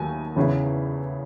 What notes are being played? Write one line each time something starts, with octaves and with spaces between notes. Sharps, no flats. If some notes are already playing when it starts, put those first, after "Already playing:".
Already playing: D#2 D#3 F#3 A3 G#5
E2 C#3 E3 B3 E4